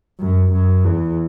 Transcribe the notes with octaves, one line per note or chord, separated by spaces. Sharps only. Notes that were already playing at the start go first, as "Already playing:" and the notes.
F#2
F#2
E2